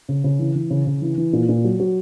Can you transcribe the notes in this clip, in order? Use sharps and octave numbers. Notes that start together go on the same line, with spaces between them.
C#3
C#3
E3
E3
C#3
C#3
E3
E3
A#2
A#2
F#3
F#3